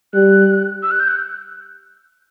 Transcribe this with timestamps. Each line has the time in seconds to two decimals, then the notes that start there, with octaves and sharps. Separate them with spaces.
0.14 G3 F#6
0.83 E6
0.91 F#6
1.00 G6
1.08 F#6